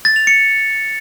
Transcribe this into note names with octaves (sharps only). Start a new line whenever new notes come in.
A6
F7
C#7